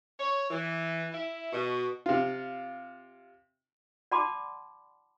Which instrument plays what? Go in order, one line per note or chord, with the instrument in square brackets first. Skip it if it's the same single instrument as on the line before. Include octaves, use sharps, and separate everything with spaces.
[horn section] C#5
E3
E4
B2
[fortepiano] C3 F4
[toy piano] D5 F#5 A5 B5 C6 D6